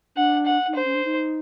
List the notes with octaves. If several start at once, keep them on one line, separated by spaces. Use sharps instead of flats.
D4 F#5
F#5
D#4
D4 C5
C#4
D4
D#4